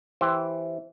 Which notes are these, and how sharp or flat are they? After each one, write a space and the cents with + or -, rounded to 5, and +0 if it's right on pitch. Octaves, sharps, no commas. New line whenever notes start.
E3 +0 G4 +0 C5 +0